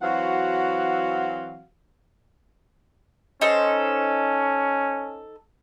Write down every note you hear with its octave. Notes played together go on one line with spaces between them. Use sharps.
E3 F#3 C4 F#4 F5 F#5
C#4 D#4 A4 C5